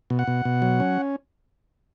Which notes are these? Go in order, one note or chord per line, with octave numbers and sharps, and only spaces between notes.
B2
F#5
B2
B2
F#3
C#4